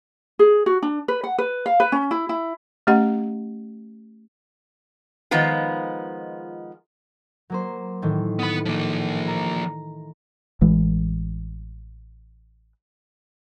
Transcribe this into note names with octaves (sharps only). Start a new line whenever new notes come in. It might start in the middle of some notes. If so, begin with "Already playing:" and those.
G#4
F#4
D4
B4
F#5
B4
F5
B4
C#4
E4
E4
A3 C#4 G4 D#5 F#5
D#3 F3 G#3 B3 F4
F#3 A#3 C5
A2 D#3 E3
B3 B5
F3 A#3
A#5
A1 E3 G#3